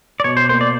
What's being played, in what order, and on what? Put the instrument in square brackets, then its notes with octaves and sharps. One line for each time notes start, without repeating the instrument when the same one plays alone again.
[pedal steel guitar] D5
[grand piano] B2 [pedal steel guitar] C#5
[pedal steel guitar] C5
[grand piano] A#3 [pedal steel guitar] C5
[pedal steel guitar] D5